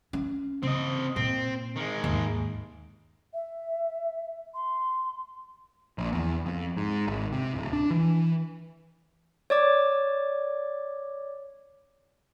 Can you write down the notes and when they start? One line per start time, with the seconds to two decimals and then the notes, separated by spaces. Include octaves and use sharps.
0.13 C#4
0.63 C#3 C4 D#5
1.16 A#2 C4
1.76 D#3 G#3
2.04 D#2 G#2
3.33 E5
4.54 C6
5.98 A#1
6.12 E2
6.46 F2
6.76 G#2
7.07 G#1
7.32 C3
7.54 D1
7.73 D4
7.90 E3
9.50 C#5 D5 D6